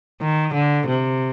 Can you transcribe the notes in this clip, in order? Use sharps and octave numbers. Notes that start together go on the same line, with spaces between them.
D#3
D3
C3